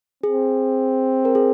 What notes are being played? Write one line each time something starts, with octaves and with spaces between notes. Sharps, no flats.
C4 G#4
A#4
G#4